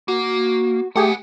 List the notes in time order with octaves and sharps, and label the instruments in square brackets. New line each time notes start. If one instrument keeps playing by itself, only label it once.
[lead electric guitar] A#3 [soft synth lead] F#4
[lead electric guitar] G3 F#5 [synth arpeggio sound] A3 G4 G#4